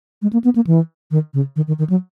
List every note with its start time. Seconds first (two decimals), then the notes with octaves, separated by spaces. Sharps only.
0.22 G#3
0.33 A#3
0.44 B3
0.56 A#3
0.67 E3
1.11 D#3
1.34 C#3
1.56 D#3
1.67 D#3
1.79 D#3
1.90 F#3